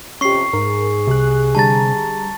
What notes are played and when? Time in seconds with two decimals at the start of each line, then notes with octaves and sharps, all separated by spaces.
0.21 F2 C3 C#4 G4 C#6 C7
0.53 G#2 G#4 A#4
1.07 C2 C3 F#6
1.55 D3 G3 A5 A#5 A6